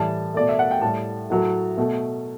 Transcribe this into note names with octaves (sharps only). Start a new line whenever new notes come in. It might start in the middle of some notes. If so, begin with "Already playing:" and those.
Already playing: A2 E3 G3 A5
B2 A3 D5
E5
F#5
G5
A2 G3 A5
A2 F#3 A3
B2 A3